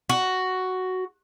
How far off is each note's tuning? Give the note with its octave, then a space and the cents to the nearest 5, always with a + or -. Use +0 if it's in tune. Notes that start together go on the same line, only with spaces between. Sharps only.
F#4 +5